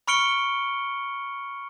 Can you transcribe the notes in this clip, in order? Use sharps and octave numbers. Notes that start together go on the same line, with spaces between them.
B5 C#6 F6 C#7 D7 G7